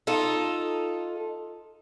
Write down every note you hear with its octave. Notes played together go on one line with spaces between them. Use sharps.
D#4 F4 A4